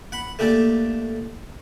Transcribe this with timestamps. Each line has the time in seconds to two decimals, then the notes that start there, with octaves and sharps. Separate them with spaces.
0.12 F#5 B5
0.39 A3 A#3 D4 G4 A4